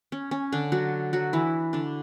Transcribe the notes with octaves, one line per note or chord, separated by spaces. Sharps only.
C#4
C#4
D3 D4
F#3 F#4
F#3 F#4
E3 E4
D3 D4